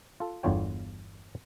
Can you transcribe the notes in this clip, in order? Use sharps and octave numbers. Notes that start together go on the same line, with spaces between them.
F4 A4
G1 E2 D3 F4 C#5 G5